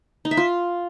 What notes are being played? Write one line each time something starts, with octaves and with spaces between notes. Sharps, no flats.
D#4
E5
F4